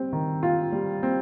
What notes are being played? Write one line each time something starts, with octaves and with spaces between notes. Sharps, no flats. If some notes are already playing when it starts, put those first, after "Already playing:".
Already playing: G3 C4
D#3
F4
G3
C4